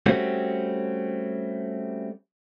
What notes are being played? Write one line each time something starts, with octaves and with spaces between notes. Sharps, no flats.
G3 A3 C4 C#4 F#4